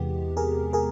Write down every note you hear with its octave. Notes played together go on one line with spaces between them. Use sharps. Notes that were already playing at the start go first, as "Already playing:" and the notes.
Already playing: E2 C3 E3 G#3 B3 G4
G#4 A#4
G#4 A#4